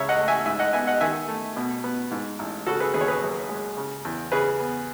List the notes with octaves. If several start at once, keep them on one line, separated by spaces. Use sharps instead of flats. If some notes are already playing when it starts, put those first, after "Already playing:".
Already playing: C#2 C#3 C#5 E5
D#5 F#5
A3
E5 G#5
G#2 E5 G#5
D#5 F#5
B3 E5 G#5
D#5 F#5
D#3 E5 G#5
A3
B2
B3
G#2
A1
C#3 F#4 A4
G#4 B4
D#2 G#4 B4
C#5
G#4 B4
F#2
G#3
C#3
E2
C#3 G#4 B4
B3